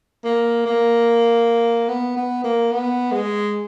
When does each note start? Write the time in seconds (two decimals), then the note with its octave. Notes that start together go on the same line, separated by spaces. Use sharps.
0.25 A#3
0.66 A#3
1.89 B3
2.17 B3
2.44 A#3
2.72 B3
3.12 G#3